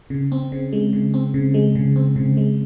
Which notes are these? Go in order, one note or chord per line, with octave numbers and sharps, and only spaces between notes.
C#3
C4
C#3
G#3
C#3
C4
C#3
G#3
C#3
C4
C#3
G#3